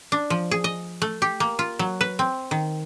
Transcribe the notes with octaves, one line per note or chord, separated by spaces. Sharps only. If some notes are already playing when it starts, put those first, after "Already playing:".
D4
F3
G#4
D#5
A3
G4
A#3
F4
F#3
B4
C4
D#3